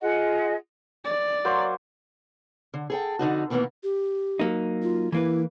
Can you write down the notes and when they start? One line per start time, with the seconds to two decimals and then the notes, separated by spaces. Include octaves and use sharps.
0.01 F4 G#4 D#5 F#5
1.05 D5
1.45 F#3 A#3 C5
2.74 D3
2.90 G#4 A4 G5
3.19 F2 D3 D#4 F#4
3.50 B2 D#3 E3 G3 A#3 B3
3.83 G4
4.39 F#3 A#3 D#4
4.82 F4
5.12 E3 A#3 E4 B4